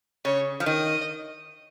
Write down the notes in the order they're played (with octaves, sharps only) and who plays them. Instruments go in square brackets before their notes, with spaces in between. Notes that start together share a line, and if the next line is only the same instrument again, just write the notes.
[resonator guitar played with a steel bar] C#3 [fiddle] C#5
[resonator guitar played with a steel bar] F3
[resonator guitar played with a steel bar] D#3 [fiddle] D#5